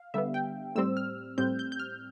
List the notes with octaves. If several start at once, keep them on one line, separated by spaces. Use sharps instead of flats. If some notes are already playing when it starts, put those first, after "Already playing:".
Already playing: F5
D3 G3 B3 E5
G5
A2 G3 C4 E6
F6
A2 G3 C4 G6
G6
G6
F6